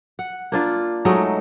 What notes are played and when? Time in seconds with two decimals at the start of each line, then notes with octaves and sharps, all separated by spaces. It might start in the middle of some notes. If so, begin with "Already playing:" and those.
0.19 F#5
0.52 A#3 D4 F4
1.05 F#3 G#3 A3 D#4